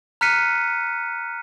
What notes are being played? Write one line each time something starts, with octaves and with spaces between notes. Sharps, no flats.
A#5 F6 F#6 B6 C#7 D#7